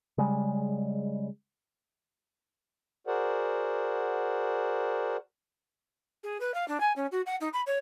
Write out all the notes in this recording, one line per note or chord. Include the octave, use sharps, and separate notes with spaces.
C#3 G3 G#3
F#4 G#4 A#4 C5 D5 F#5
G#4
B4
F5
D4
G#5
C#4
F#4
F#5
D#4
B5
C#5